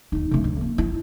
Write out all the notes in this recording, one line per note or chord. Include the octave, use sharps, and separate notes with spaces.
D#2 D#4
C#3 A3
D2
A#3
E4